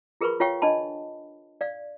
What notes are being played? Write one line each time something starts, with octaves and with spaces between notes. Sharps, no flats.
F4 G#4 A#4 B4 B5 C#6
F4 C#5 F5 G5 C#6
D4 D#5 A5 B5
D5 F5